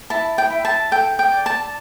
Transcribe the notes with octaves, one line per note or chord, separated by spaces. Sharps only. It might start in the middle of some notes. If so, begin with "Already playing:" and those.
E4 A5
G5
E4
A5
A4 G5
G5
D5
A5